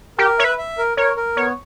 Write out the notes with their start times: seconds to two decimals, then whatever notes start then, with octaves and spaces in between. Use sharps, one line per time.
0.18 G4 A#4
0.39 C#5 E5
0.44 B4
0.58 E5
0.78 A#4
0.97 A#4 C#5
1.17 A#4
1.37 B3 C#5